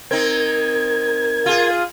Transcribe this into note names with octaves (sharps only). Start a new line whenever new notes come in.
C4 D#4 A#4 G#6
F4 G#4